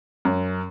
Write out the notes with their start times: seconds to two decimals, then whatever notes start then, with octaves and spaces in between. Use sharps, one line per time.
0.25 F#2